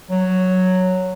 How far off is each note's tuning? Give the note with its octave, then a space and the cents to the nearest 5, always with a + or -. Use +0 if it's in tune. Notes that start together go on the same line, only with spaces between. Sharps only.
F#3 +0